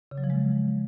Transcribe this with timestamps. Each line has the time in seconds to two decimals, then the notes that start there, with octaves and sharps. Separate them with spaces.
0.11 C#3
0.18 F#3
0.24 F3
0.30 G#3